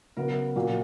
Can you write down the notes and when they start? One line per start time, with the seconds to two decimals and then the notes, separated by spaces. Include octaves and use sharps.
0.17 C#3 F#3 B3 A#4
0.56 A#2 F#3 A#3